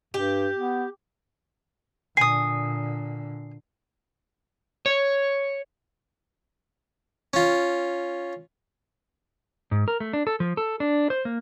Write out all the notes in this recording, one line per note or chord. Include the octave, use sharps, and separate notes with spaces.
G2 G4
B3
A#2 D3 G#5 D#6 C7
C#5
C#4 F4
G#2
A#4
A3
D4
A4
F3
A4
D4
C5
A#3